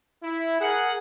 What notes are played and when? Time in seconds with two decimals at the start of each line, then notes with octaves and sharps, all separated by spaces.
0.22 E4
0.61 G#4 A#4 F#5